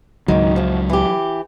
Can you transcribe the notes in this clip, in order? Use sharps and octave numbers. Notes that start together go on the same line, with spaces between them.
C#2 G#2 D#3 F#3
F#2 F3
E3 G4